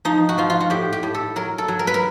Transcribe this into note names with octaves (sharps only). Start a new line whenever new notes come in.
F3 D#4
F#4
F3 F4
F4
F#4
A2 G4
G4
A2
A4
F#3 A#4
A4
F#3
A#4
B4
A#4